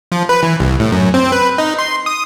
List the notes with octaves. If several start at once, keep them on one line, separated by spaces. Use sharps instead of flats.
F3
B4
E3
C2
A2
F#2
C4
B4
D#4
C6
D#6